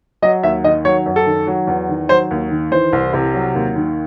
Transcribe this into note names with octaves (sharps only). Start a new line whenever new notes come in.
F#3 D#5
D#2 E5
D#3 D#5
F#3 C#5
F#2
A4
D#3
F#3
E2
D#3
F#3 C5
D#2
D#3
E3 C5
C2
C3
F#3
D#2
D#3